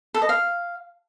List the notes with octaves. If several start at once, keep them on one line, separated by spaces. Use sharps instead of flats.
A4
D#5
F5